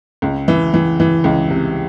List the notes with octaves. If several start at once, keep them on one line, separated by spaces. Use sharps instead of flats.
C#2
E3
E3
E3
C#2
C3